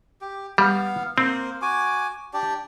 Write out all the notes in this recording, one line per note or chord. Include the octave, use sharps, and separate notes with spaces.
G4
G3 B3 F5
A#3 C4 C5
F#4 G#5 D6
D4 G4 D5